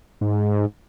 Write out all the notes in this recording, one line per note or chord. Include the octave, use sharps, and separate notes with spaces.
G#2